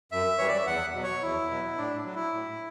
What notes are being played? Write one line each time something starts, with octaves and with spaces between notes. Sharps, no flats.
F#2 E5
E3 G3 C#5
D5
E5
E2 F#5
B2 F#3
C#5
E2 E4
B2 F#3
A2 D4
F#3
E4
A2